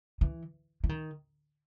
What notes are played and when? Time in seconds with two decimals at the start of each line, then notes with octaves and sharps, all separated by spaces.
0.21 E3
0.84 E3
0.89 D#3